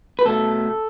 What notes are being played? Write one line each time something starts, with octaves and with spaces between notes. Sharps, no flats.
B4
B2 A3 A4